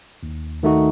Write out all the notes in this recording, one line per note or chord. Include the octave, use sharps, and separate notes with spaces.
D#2
D#3 A3 D#4 F#4